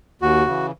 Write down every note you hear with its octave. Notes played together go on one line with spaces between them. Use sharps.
D#2 F#4
C#3 E3